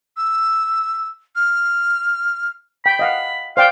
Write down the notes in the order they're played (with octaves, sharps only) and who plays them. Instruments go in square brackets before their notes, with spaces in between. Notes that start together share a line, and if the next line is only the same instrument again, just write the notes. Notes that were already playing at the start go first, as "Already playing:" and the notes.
[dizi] E6
F6
[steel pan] G5 [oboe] B5
[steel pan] D#5 F5 F#5
[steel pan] C5 D5 G5 [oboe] F5